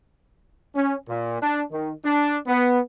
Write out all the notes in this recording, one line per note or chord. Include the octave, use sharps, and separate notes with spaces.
C#4
A#2
D4
D#3
D4
B3